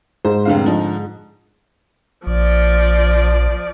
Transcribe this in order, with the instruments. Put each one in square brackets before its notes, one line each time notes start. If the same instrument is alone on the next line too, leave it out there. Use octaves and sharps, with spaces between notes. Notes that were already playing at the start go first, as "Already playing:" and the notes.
[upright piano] G#2 [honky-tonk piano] C5
[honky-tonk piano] F1 D3 F5
D3 F3 D#4
[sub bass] A#1 [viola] F3 D5